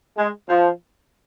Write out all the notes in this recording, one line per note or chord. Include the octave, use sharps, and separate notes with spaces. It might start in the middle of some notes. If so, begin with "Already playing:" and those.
G#3
F3